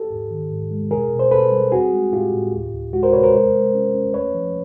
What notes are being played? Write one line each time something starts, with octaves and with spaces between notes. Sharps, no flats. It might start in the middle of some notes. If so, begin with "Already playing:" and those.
Already playing: G4 A4
G#2
D#3
G#2
G#3
B2 G#4 A#4
B2
C5
B2 A4 B4
G3
C4 F#4 G#4
G#3
A2 F4 G4
A2
D2
D2
G#3 F#4
A#4 C5
C3 B4 C#5
A#4 C5
G#3
G#3
C#4
C#4
A3 B4 C#5
F3